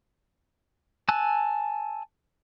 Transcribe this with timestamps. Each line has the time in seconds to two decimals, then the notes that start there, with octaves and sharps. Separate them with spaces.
1.09 G#5 A5 E6 F#6